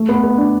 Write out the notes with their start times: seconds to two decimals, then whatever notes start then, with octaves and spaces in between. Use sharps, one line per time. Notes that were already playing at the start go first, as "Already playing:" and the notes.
Already playing: A3
0.09 B3
0.24 B3
0.38 D4